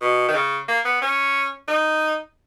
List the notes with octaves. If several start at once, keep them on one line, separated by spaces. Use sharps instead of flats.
B2
D#3
C#3
A#3
B3
C#4
D#4